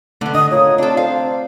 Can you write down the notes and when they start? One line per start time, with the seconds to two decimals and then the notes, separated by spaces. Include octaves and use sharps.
0.21 D3 A3 B3
0.35 D3 D#5 D#6
0.51 A3 F4 A#4 C#5
0.78 C4 D4 F4 A4
0.97 C5 F5